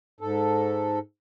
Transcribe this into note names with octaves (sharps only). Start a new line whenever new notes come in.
G#2 A4